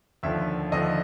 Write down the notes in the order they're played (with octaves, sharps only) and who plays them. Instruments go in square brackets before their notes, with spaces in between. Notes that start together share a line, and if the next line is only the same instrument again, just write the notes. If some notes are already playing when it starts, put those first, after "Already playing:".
[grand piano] D#2 D3 F3 E5
D#2 D3 F3 D#5